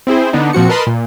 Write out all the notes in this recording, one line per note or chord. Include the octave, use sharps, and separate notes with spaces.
C4 E4 G#4 C5
D3 B3 D4 D#4
A#2 F3 C4 F#4 C#7
A#4 B4 D#5 A5 B5 C6
A#2